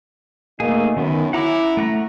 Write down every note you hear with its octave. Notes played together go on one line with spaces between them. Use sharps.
B2 A3 A#3 D#4 G#4
F#2 D#3 B3 C#4
E4 F#5 A#5 D6
A3 F#5 A#5